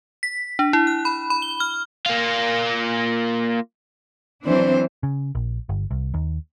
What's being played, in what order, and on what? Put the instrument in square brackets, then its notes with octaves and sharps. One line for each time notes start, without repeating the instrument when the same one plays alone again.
[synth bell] B6
D4
E4
F#6
B5
B5
G7
F6
[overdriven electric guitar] A#3 F4
[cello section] E3 C4 D4 [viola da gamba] F#3 C5
[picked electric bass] C#3
A#1
G1
C2
D#2